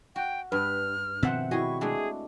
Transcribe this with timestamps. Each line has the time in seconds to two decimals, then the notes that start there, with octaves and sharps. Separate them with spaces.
0.16 F#4 G5
0.52 G2 B4 F6
1.23 B2 D#3 F3 C4 A4 C5 E5 F#5
1.51 G3 E4 F#4 G#4 D#5 C#6
1.81 G#3 A3 D4 G#4